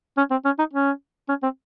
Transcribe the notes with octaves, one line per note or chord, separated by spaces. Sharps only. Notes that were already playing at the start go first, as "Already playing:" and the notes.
C#4
C4
C#4
D#4
C#4
C#4
C4